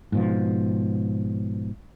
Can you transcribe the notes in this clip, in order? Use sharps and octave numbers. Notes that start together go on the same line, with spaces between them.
G#2 B2 F3